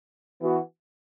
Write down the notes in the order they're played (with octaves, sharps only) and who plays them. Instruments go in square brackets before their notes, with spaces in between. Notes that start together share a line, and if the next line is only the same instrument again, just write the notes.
[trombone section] E3 B3 F#4